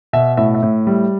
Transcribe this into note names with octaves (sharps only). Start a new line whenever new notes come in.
B2 E5
A2 E5
E5
A2
G3